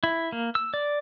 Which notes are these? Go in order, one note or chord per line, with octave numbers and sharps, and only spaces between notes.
E4
A#3
E6
D5